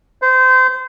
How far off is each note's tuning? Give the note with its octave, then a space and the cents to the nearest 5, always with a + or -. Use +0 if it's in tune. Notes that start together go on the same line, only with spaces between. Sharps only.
C5 -25